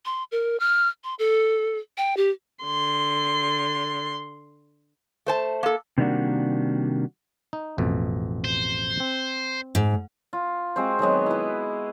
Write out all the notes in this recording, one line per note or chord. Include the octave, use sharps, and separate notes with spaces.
C6
A#4
F6
C6
A4
G5
G4
D3 C6
A3 C5 A5
A#3 A4
C3 D#3 G3 A#3 D4 F#4
D#4
A1 F2 B2
C5
C4
G#2
F4
G#3 C4 F#4 C5
D#3 F#3 G#3 B3
E4 B4